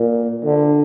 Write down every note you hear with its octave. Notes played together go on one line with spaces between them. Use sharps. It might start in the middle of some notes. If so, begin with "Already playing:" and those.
Already playing: A#2
D3